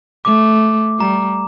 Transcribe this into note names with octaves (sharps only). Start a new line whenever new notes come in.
A3 D6
G3 A#5